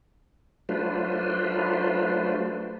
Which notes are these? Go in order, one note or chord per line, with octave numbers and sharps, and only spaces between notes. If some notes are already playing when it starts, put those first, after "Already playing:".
F#3 A3 D4 F4 B4 C5